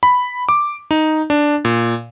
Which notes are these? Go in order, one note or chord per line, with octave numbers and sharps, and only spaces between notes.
B5
D6
D#4
D4
A#2